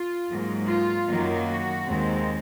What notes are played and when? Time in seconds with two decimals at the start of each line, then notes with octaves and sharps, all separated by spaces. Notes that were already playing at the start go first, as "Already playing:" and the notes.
Already playing: F4
0.28 G#2 F#3 A#3
0.67 F4
1.07 F#2 D#3 F#3 A#3
1.47 F#4
1.86 D#2 D#3 G#3 C4